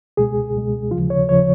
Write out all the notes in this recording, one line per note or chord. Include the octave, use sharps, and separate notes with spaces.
C#2 B2 G#3 G#4
C#2 B2 G#3
D#2 C#3 F3 F4
C#5
D#2 C#3 F3 C#5